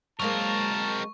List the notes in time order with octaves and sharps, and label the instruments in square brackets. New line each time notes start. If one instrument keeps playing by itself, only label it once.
[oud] F#3 G#3 A#3 [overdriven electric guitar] C4 A#4 [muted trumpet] A5 [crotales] C#6